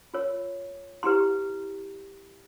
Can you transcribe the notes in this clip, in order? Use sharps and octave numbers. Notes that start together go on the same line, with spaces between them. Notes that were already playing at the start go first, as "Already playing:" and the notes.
F4 A#4 C#5
E4 G4 B4 A#5 C6